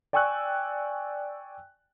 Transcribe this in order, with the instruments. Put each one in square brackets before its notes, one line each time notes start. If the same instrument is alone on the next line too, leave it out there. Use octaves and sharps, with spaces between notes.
[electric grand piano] D5 G5 G#5 C#6 E6 F#6